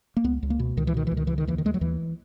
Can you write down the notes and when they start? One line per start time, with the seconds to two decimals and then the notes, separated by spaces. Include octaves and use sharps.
0.17 A#3
0.24 C#2 B3
0.43 C#2
0.50 A#3
0.59 B2
0.77 C#2 D#3
0.87 E3
0.94 B2 D#3
1.07 C#2 E3
1.17 D#3
1.27 C#3 E3
1.38 D#3
1.47 D#2 E3
1.58 D#3
1.65 D#2 G#3
1.74 F#3
1.81 D#2 E3